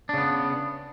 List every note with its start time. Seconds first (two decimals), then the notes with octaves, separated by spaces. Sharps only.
0.09 D4
0.14 C#3
0.18 B3